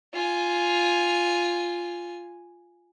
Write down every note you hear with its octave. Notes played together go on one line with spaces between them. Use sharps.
F4 G#5